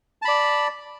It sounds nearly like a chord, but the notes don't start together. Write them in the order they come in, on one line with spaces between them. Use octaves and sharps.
A5 B5 D5